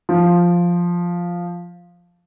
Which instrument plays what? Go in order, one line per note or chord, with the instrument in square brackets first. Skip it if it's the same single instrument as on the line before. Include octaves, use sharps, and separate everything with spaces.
[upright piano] F3